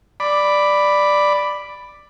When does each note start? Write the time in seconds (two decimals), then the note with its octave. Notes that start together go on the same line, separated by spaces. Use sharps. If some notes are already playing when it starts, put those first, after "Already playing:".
0.20 D5 B5